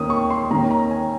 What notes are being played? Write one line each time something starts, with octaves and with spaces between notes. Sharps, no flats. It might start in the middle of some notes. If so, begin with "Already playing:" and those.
Already playing: D#2 D#3 A#3 C#4 D#6
C#6
C6
D#2 D#3 A#3 C#4 A#5
A#5
G#5